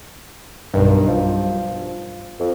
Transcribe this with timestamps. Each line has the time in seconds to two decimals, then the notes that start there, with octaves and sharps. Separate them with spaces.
0.74 B1 G2 D#3
1.08 F3
2.40 F2